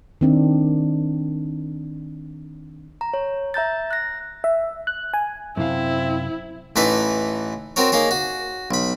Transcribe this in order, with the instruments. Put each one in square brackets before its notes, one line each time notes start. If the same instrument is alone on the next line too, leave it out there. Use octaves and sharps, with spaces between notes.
[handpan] D#3 C4 D4
[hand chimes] A#5
C#5
E5 A#5 G6 A6
F#6 A#6
[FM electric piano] E5
F#6
G#5
[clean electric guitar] F#2 C3 F5 [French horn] C4 [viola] E4
[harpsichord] A1 E3 A3 D#4 B4 E5
C4 F#4 A#4 C#5
A#3 D#4 G#4 C#5
F#4
B1 B5